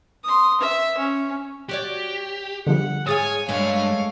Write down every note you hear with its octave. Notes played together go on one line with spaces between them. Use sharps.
C6 D#6
E5
C#4
F#4 G4 C#5 D5
D3 F3 G3 F#5
G#2 G#4 C#5 F5 G#5 D#6 A6
G2 G#3 A3 C#5 F5